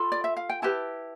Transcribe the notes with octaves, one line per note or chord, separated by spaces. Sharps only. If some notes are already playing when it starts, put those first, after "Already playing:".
Already playing: F4 A4 B5
D5
E5
F5
G5
E4 G4 B4 A5